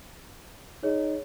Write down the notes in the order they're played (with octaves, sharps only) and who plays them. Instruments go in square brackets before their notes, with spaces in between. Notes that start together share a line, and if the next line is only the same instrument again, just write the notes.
[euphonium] D#4 [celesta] G#4 C#5